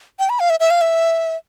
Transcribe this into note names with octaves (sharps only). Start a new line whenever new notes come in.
G5
B5
F5
E5
E5
F5
E5